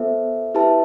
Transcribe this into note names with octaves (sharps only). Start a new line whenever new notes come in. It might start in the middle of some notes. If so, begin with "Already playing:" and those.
Already playing: B3 F4 A4 C5 E5
E4 G4 B4 E5 A5